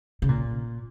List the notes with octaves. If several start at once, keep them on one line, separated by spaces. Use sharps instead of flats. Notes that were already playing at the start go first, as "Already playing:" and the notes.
C#3
A#2